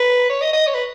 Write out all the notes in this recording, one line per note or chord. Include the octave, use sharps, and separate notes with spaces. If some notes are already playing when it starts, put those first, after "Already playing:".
Already playing: B4
C#5
D#5
D#5
C#5
B4